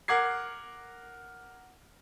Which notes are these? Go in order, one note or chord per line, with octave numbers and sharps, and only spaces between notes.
A#4 F#5 D6 G#6 C7